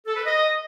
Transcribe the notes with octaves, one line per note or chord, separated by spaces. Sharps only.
A4
B4
D#5